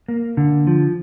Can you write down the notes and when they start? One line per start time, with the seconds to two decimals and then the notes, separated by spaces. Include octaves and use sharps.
0.08 A#3
0.37 D3
0.67 F3